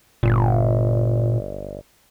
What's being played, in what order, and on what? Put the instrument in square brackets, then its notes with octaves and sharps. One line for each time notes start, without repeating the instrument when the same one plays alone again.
[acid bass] G1 [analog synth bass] A#2